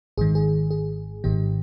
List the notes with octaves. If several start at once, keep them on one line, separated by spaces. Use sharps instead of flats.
G#1 G#2 D#3 G#4
G#4
G#4
G#1 G#2 D#3 G4